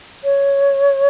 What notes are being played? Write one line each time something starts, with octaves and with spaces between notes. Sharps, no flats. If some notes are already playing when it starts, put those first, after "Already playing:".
C#5